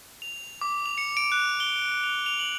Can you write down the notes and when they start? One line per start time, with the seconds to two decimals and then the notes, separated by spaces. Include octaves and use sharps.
0.22 F7
0.61 D6
0.86 F7
0.98 C#7
1.17 D7
1.32 F#6
1.60 G7
2.03 F7
2.26 F7
2.39 F#7